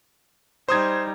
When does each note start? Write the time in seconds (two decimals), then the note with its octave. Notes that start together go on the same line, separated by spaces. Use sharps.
0.69 G3 D#4 C5 D#6 G#6